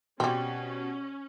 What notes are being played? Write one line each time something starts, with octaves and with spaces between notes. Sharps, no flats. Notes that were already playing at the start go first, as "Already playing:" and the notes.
B2 G3 C4 C#4